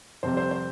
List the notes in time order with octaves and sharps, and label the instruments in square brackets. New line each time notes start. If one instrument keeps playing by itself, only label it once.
[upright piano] F2 C3 G3 C4 C5
C5
C5